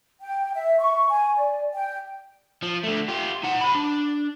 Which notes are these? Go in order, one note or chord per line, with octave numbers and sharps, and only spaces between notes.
G5
E5
C#6
G#5
D5
G5
F3
D3 A3
F4 G4
D#4 F#5
C5 B5
D4